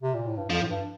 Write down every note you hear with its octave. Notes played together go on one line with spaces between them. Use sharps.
C3
A#2
A2
G2
F2 F3
A2
G2